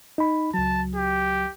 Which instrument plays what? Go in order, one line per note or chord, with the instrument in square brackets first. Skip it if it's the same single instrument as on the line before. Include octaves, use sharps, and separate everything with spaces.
[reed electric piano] D#4 B5
[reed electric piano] C#2 F#3 [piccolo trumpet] A5
[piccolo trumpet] G4